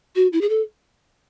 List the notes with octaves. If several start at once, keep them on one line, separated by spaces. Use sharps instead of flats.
F#4
E4
G#4
A4